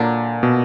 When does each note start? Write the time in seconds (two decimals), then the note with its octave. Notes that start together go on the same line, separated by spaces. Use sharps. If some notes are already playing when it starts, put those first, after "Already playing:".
Already playing: A#2 D3 F#3 A#3 D4
0.43 B2